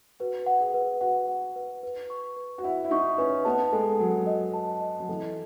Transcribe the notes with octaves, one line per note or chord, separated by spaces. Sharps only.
F#4 B4
F#5
G#4
B4
F#4 F#5
F#5
B4
B4
C#6
B4
F#4
E4 F#5
E4
D#4 C#6
C#4 B4
B3 A5
G#3 A4
F#3 A4
D#5
A5
D#5
F#3
E3 A4